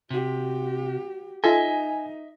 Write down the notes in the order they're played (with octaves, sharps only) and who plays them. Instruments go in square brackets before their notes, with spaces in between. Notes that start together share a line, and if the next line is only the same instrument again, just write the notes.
[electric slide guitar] C3 [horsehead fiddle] F#4 G4
[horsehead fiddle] D#4 [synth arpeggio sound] F4 A4 [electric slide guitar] D#5 E5 [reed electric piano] G#5